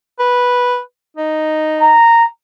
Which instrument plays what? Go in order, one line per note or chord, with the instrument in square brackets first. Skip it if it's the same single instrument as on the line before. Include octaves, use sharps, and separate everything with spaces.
[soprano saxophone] B4
D#4
[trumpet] A#5